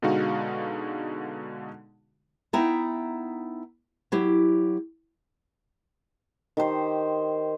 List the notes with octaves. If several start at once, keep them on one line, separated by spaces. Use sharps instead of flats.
B2 D3 G#3 D#4 F#4 F5
B3 D#4 E4 G5 A#5
F#3 E4 G4
D#3 G4 C5